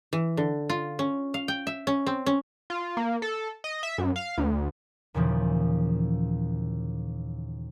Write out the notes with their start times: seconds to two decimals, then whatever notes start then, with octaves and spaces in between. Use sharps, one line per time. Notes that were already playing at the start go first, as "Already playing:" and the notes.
0.13 E3
0.37 D3
0.70 F4
0.99 C#4
1.34 F5
1.48 G5
1.67 E5
1.87 C#4
2.07 C4
2.26 C#4
2.70 F4
2.97 A#3
3.22 A4
3.64 D#5
3.83 E5
3.98 F#2
4.16 F5
4.38 D2
5.14 D#2 A#2 C#3 E3 F3